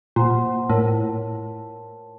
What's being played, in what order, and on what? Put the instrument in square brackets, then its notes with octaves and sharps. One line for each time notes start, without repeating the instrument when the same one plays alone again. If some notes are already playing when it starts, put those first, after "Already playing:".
[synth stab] A#2 [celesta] F4 C5 F#5 C6
[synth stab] A2 [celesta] A#4 C#5 A5